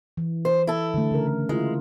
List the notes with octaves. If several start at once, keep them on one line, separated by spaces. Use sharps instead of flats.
E3
C5
E4 A4
D3 A3
C#3 A#4
G#3 E4 F4